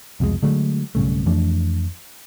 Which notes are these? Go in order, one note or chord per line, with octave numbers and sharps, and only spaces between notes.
C2 F2 B2 G#3
D3 F#3 G#3 A3
B1 G2 C#3 A3
F2 E3 A3 D4